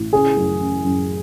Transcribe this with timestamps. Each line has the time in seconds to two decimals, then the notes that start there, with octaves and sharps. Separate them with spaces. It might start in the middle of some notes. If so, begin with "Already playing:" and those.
Already playing: A1
0.13 C#3 G#4
0.37 F#2
0.61 C#3
0.84 F#2